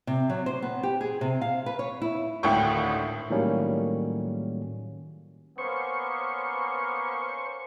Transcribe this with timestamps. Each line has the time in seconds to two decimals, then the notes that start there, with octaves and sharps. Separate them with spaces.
0.07 C3
0.30 F#3
0.46 C5
0.62 B3
0.83 G4
1.01 G#4
1.21 C3
1.41 F5
1.66 B4
1.79 C#5
2.02 E4
2.43 G#1 D2 A2 E4 G5 C#6
3.30 A2 D#3 F#3 G3 A#3 C#4
5.58 A#3 B3 C#4 C5 C#6